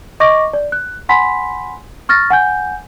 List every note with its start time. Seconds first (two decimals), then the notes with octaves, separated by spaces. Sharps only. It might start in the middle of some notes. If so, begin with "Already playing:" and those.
0.20 D#5 C#6 D6 A#6
0.53 D5
0.72 F#6
1.09 F#5 G#5 B5 C6 B6
2.09 C#6 F6 A6 A#6
2.30 F#5 G#5 G6